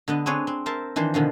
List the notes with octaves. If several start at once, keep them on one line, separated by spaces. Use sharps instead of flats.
D3 B3 D#5
C4 D4 G#4 B4 C#5
C4
A#4 C5 E5 A5
D#3 E3 D4 C5
B2 D3 D#3 F3